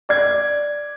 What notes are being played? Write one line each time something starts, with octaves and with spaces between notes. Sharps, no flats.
D5 G#6